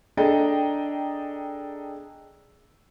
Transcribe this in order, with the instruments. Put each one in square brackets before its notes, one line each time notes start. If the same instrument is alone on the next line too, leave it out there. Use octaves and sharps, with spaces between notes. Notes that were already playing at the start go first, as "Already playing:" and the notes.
[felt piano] D4 G#4 A4 D#5 G5 A#5